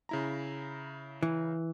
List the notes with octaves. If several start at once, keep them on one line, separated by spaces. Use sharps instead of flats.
C#3 E4 A#5
E3